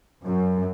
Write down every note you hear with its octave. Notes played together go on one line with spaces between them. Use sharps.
F#2